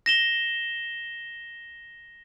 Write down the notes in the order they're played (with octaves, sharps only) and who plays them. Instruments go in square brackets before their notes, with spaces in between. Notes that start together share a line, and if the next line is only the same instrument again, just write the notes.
[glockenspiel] A#6 E7 G7